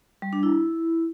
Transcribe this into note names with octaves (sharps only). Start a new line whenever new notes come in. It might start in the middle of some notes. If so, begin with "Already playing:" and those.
G3
D4
E4